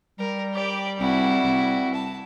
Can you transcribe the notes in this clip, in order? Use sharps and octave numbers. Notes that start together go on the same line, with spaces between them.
G3 A#4
G4 D5
C2 E4 F#4
C2
A5